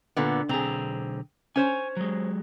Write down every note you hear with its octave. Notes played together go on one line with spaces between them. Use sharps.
A#2 D3 B3
B1 D3 C4 G#4 A#5
C#4 C5 C#5 G#5
F#3 G#3